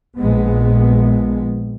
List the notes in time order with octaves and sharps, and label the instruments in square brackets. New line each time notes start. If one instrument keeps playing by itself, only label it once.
[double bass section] A#1 G#3 B3